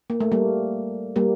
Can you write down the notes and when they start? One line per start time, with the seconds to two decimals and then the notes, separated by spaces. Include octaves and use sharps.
0.10 A#3
0.20 A3
0.32 G3 A#3
1.16 G3 A#3